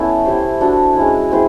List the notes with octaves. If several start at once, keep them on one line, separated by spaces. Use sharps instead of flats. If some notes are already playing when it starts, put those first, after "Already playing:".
Already playing: A3 B3 C#4 E4 A4 B4 C#5
E4 G4 C5
D4 F#4 A4
G#3 C#4 E4
C4 E4 G#4 B4